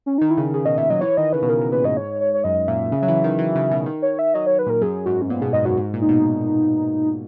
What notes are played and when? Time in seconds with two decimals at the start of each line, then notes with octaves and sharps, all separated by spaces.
0.06 C#4
0.18 D#3 D#4
0.30 E4
0.38 C#3
0.54 C#3 G#4
0.65 B2 D#5
0.78 A#2 E5
0.90 F#3 D#5
1.01 E3 C#5
1.17 D#3 D#5
1.33 C#3 B4
1.42 B2
1.49 C#3 A#4
1.61 B2
1.72 A#2 B4
1.84 G#2 D#5
1.97 C#5
2.21 C#5
2.34 C#5
2.44 F#2 D#5
2.68 A#2 E5
2.92 C#3
3.03 F#3
3.08 E3
3.24 D#3
3.39 E3
3.55 C#3
3.71 B2
3.86 D#3
4.02 C#5
4.19 E5
4.34 F#3 D#5
4.47 C#5
4.59 B4
4.67 A#2 A#4
4.81 F#2 G#4
5.06 G#2 F#4
5.22 C#4
5.30 A#2 B3
5.42 B2 G#4
5.53 G#2 D#5
5.65 F#2 F#4
5.77 G#2
5.94 A#2
6.01 D#4
6.09 B2